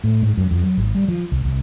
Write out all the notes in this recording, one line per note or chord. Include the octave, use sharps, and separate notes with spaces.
A2
G#2
F#2
F2
F#3
G#1
G3
F3
C2
C2